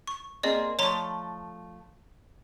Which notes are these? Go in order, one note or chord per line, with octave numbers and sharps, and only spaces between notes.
C#6
A#3 C4 G#4 D5 D#5
F3 A3 C#5 A#5 C6